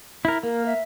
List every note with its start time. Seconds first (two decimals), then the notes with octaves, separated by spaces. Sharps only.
0.25 E4 A#4
0.43 A#3 A#4
0.66 E5